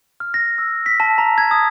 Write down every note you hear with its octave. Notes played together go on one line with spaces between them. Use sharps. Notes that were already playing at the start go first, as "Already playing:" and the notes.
F6
A#6
E6
B6
A5
A#5
G#6
D#6